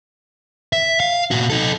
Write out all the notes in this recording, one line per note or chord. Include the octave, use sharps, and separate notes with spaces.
E5
F5
A#2 F#4
D#4 A4